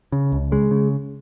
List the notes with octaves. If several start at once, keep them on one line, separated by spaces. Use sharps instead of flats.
C#3
C#2
C#3 G#3
C#3